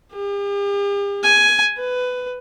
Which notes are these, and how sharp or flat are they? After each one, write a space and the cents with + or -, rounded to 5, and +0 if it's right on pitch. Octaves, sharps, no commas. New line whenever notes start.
G4 +45
G#5 +10
B4 +15